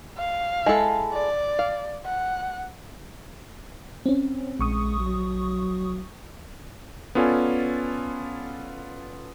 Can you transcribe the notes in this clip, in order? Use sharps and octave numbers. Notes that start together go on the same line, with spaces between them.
F5
G#3 E4 A4
D5
F5
F#5
C4 C#4
A#1 G#3 C#6 D#6
F#3
B3 C#4 F4 A4 D5 G#5